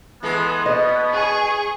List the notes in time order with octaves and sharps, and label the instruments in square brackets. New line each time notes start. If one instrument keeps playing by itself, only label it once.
[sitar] E3 G#3 A4 [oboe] B3
[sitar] B2 [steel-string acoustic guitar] D#5
[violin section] G#4 C#6